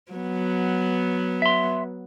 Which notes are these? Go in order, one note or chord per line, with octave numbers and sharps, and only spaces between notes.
F#3 B3
E5 C6